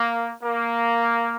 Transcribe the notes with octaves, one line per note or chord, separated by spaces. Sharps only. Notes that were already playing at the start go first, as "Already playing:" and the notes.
Already playing: A#3
A#3